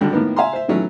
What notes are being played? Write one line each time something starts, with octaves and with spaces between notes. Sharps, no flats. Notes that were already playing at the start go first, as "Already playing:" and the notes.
G#1 D3 G3
A2 D#3 A#3 B3
E5 F5 G#5 A#5 C6
C5 E5
D#3 E3 F#3 A3 C#4